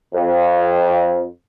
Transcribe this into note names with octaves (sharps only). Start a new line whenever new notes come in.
F2